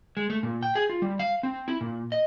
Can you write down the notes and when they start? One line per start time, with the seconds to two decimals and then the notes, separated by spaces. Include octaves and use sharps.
0.17 G#3
0.30 A3
0.43 A#2
0.63 G5
0.75 G#4
0.90 F4
1.02 G3
1.19 F5
1.43 C4
1.68 E4
1.81 A#2
2.12 D#5